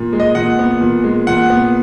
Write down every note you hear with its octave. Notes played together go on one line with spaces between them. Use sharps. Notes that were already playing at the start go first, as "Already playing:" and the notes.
Already playing: A#2
G#3
D#5
A#2 F#5
B3
A#2
G#3
A#2 F#5
B3